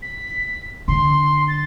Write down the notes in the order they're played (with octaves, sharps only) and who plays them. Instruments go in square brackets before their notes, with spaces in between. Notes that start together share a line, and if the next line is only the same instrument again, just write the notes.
[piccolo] B6
[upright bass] D3 [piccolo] C6
[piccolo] A6